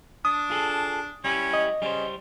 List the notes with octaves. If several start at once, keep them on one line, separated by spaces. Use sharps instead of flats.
D4 D#6
F4 G#4 A4
G3 C#4 E4 G4
D#5
C#3 G3 C5